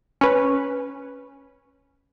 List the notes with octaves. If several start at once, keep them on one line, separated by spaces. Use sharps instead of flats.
C#4 B4